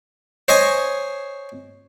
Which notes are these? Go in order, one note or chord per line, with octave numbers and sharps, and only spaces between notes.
C5 C#5 D#5 G#5